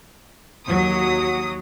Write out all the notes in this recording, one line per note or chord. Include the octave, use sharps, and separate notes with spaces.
D#2 F#3 D#6